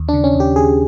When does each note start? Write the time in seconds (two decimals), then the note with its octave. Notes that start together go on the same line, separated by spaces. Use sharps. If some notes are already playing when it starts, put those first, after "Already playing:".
Already playing: D#2
0.09 D4
0.13 C#3
0.24 C#4
0.35 D#2
0.40 G4
0.56 D#2 G#4